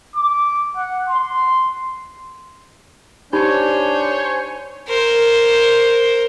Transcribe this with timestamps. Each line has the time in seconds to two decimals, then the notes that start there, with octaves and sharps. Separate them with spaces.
0.16 D6
0.77 F#5
1.10 C6
3.33 D4 D#4 G4 C5 C#5 G#5 B5
4.88 A#4 C5